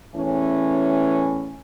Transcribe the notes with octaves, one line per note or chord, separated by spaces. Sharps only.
E2 A2 E3 C#4